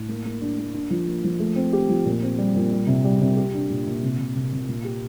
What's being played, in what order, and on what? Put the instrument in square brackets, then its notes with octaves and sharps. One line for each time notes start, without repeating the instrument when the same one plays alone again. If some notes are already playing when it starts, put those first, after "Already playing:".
Already playing: [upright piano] A2
A#3
A#3
D4
A#3
D4
F3
A#3
F3
A3
C4
G4
F3
A#2
C4
G3
A#2
G3
C3
G3
C3
G4
D4
A#2
A#2
C3
C3
C3
C3
A#2
G4